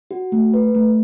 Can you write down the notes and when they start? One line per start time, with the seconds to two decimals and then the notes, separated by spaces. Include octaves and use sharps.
0.11 F#4
0.32 A3
0.54 B4
0.75 A3